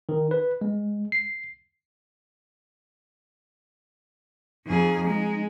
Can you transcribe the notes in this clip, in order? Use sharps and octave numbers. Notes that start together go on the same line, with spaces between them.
D#3
B4
G#3
C7
F2 D#4 G#4
G#3